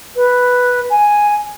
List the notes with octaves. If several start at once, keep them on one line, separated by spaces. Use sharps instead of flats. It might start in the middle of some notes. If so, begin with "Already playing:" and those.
B4
G#5